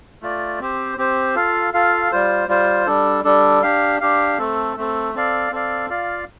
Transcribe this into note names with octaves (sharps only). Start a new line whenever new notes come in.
A3 F4 D5
C4 G4 C5
C4 G4 C5
F4 A4 F5
F4 A4 F5
G3 F4 C5
G3 F4 C5
G3 D4 A4
G3 D4 A4
D4 G4 F5
D4 G4 F5
A3 C4 A4
A3 C4 A4
C4 A4 D5 F5
C4 A4 D5 F5
F4 D5 F5